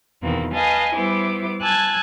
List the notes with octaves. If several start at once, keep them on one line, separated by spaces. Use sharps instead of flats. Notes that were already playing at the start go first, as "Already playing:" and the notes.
E2 B2 D#3 E3 A#3 C4
B4 D#5 F5 G#5 A5
G3 B3 E4 C5 D6
G#5 A5 E6 F#6 G#6